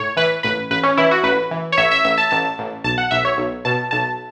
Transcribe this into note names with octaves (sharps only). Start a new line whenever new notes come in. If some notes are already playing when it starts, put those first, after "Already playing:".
Already playing: A2 C#5
E3 B4
A1 B4
A1 B4
C#4
E3 E4
F#4
A1 B4
E3
C#5
A1 E5
E5
A1 E5
A5
A1 A5
A1
B1 A5
F#5
B1 E5
C#5
B1
B2 A5
B1 A5